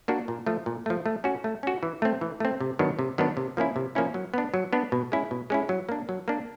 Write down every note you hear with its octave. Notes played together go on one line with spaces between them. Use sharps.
A#3 D4 F#4
A#2
F3 A3
A#2
F3 A3
A3
C#4 F#4
A3
C#4 F#4
E3
A3 C4
E3
A3 C4
C3
D#3 F#3 B3 D4
C3
D#3 F#3 B3 D4
C3
F3 A#3 C#4 E4
C3
F3 A#3 C#4 E4
F#3
B3 D4
F#3
B3 D4
B2
G#3 C#4 E4
B2
G#3 C#4 E4
F#3
A#3 D4
F#3
A#3 D4